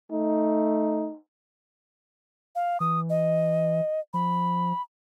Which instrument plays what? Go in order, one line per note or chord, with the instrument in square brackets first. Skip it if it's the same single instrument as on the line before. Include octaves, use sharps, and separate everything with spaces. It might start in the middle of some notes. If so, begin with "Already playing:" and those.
[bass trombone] A3 [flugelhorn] D#4
[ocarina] F5
[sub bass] E3 [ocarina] D#6
[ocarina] D#5
[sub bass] F3 [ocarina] B5